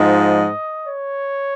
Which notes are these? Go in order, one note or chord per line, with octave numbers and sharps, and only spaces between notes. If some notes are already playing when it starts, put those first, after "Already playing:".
Already playing: G#2 F3 D#5
C#5